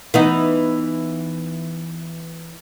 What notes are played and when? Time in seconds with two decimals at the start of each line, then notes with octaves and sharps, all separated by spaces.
0.14 E3 B3 D#4